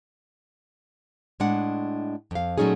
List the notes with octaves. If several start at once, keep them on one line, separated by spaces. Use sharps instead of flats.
A2 G#3 D4 F#5
F2 F5
A#2 F#3 A3 C#4 D#4 G#4